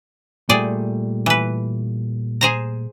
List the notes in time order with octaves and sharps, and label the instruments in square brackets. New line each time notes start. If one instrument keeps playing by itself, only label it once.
[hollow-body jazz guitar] A#2 G3 A3 [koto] G#4 D5 G5
[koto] E3 B4
G#4 C5 A#5